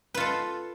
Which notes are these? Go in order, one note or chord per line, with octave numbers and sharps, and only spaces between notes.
F4 A4 B4